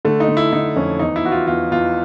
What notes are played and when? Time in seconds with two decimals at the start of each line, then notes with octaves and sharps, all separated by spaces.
0.05 D3 A3
0.20 D#4
0.28 D3
0.37 E4
0.52 D3 D#4
0.76 F2 C#4
0.99 E2 D#4
1.16 E4
1.24 E2 F#4
1.32 F4
1.47 E2 F4
1.71 E2 F4